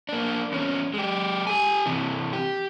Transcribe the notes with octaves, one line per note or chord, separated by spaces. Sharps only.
A#3 D4
E2 C#4
G#3 G4
G4 G#5
C3 E3
G4